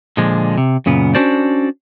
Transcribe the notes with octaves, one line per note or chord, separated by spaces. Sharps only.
A#2 D3 F3 G#3
C3
F#2 A#2 C#3 B3
C#4 D4 F#4 A4 C5 D5